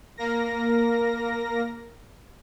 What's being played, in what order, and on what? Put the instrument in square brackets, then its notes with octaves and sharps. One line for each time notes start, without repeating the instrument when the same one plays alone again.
[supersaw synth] A#3 A#4 A#6